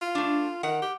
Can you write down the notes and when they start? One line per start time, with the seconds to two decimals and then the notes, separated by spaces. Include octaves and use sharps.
0.02 F4
0.15 A3 D4
0.63 D#3 F#5
0.82 G4